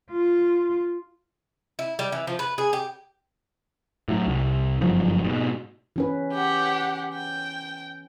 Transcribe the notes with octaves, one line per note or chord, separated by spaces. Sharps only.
F4
E4
G3
E3
F3
B4
G#4
G4
A2 F#3
C2
F#1 G2 F3 F#3
G#2 B2
E3 C#4 B4
G4 F#5
G5